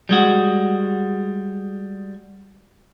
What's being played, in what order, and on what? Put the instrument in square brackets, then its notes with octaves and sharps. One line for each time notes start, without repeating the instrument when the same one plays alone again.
[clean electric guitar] G3 G#3 F#4